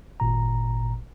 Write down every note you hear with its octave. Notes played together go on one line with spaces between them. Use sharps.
G#1 A#2 A#5